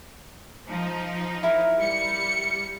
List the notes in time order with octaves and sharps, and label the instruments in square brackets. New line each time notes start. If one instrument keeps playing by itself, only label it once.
[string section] F3 D#4
[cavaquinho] E4 A#4
[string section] G3 C#7